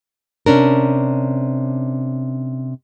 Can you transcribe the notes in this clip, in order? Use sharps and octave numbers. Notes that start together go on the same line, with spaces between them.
C3 C#4 D4 A#4